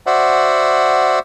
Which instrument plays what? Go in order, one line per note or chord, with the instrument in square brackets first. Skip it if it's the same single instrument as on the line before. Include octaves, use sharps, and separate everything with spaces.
[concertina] F#4 C5 D5 E5 F#5